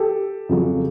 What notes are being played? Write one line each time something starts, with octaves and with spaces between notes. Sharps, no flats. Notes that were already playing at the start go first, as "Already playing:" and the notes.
Already playing: G4 A4
F2 C#3 F#3